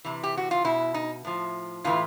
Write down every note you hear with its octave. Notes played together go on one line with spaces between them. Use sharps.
C3 E3
G4
F#4
F4
B2 E4
D#4
A2 F3
A2 E3 F4